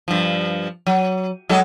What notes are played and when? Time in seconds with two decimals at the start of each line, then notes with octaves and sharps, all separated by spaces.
0.08 G2 F3
0.87 F#3
1.49 F#3 G#3 A4